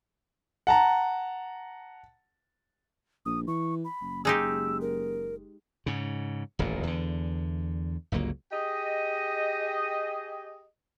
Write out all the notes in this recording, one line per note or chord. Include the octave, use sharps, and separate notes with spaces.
F#5 A5 A#5
A#1 D#6
E3 C#6
B5
F#1
G#3 D#4 G4 E6
A#4
G#2 C#3
D#1 A1 F2 A#2
E2 D3
G1 C#2 F#3 A#3
G4 G#4 D#5